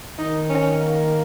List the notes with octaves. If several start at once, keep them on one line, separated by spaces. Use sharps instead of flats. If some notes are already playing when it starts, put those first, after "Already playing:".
D#3 D#4
C#4
A#3